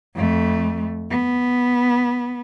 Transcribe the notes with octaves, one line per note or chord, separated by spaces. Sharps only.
F2 A3
B3